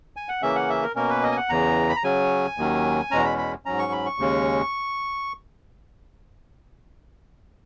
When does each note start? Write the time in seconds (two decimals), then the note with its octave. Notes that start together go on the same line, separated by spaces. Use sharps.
0.16 G#5
0.29 F#5
0.42 C#3 E3 A#3 C#4 E5
0.55 F#5
0.70 E5
0.82 A#4
0.96 B2 A#3 C#4 A#4
1.10 B4
1.23 D#5
1.32 G#5
1.37 F#5
1.49 E2 C#3 E3 A#5
1.89 B5
1.96 A#5
2.04 C#3 F#3 C#4 G#5
2.57 D#2 D#3 F#3 C#4
3.11 E2 B2 G#3 C#4 A#5
3.25 B5
3.38 B5
3.65 G#2 F#3 C#4 A#5
3.79 C#6
3.92 B5
4.05 C#6
4.18 D#2 C#3 G#3 C#4